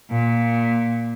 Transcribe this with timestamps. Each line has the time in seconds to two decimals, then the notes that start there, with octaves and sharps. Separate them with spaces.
0.11 A#2